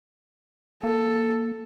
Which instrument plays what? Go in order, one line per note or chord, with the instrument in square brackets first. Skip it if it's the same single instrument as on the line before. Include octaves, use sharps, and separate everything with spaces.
[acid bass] A#3 [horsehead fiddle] A4